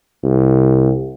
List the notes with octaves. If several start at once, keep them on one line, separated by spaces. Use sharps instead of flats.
C2